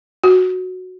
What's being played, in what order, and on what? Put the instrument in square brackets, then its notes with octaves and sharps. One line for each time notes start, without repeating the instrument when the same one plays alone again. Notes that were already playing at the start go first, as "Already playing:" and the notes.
[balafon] F#4